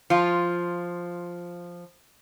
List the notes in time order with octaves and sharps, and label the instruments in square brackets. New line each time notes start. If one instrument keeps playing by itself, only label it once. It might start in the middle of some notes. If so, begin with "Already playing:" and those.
[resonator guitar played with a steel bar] F3 F4